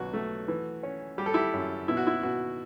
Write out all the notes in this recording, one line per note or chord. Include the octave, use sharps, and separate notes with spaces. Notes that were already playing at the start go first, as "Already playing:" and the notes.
Already playing: B1 F#4
A3
E3
C#4
G3 G4
A4
E4 G4
F#2
B2 E4
F#4
E4
B2 F#4